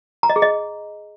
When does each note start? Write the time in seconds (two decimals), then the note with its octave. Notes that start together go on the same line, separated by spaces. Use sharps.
0.23 A#5
0.30 D#5
0.36 G#4
0.42 D#5